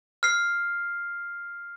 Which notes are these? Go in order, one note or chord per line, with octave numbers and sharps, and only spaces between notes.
F6 C7